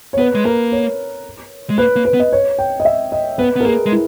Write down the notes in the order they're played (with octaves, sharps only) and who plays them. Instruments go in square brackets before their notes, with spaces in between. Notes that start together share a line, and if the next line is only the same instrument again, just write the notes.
[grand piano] C#5
[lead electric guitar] B3 [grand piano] B4
[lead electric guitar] G#3
[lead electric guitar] A#3 [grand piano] A#4
[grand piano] C#5
[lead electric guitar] G#3
[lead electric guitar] A#3 [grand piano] B4
[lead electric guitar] A#3
[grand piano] B4
[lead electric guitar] B3
[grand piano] D#5
C#5
G5
D#5
E5
D#5
[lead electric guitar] B3 [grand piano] B4
[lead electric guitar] B3
[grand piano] A#4
[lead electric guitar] A#3 [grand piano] G#4
[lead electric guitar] G#3
[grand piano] E4